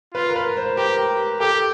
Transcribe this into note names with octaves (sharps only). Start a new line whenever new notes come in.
F4 B4
A#4
B4
C5
G4 A#4
G4 A4